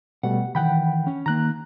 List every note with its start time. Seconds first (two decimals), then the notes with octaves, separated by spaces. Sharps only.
0.23 B2 G3 A3 F#5
0.55 D#3 E3 F#5 G5 B5
1.07 C#4
1.26 D#3 A#3 A#5 F#6